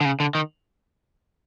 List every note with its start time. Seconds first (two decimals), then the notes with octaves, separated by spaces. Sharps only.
0.01 D3
0.05 C#3
0.20 D3
0.35 D#3